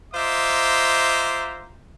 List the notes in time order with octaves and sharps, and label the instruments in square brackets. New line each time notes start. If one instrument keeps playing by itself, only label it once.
[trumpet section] F4 C5 D#5 E5 A#5 D6